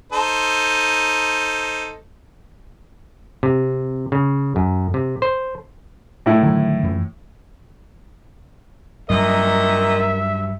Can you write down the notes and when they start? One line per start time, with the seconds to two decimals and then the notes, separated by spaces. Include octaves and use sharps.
0.13 D#4 A4 C5
3.43 C3
4.12 C#3
4.56 F#2
4.94 C3
5.22 C5
6.26 A2 E4
6.43 D3 D#3 F#3
6.83 F#2 E3
9.10 G2 A#2 D#3 F#3 A#4 D#5 E5